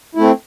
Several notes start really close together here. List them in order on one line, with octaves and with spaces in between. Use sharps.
E4 A3 C4